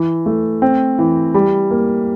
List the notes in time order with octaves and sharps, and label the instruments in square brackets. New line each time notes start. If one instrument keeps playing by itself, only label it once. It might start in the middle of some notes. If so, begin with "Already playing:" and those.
Already playing: [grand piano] E3
A3
C4
E3
G3
A#3